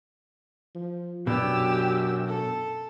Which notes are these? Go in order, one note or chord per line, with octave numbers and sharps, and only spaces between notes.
F3
F#2 B2 D4 G4 E6
A4